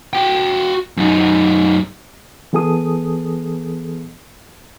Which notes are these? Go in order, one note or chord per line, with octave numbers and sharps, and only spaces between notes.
F#4 G5
F#2 D#4
E3 B3 G#4 A4 D#6